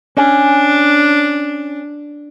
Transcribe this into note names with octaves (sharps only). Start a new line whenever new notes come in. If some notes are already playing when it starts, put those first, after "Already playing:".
C#4 D4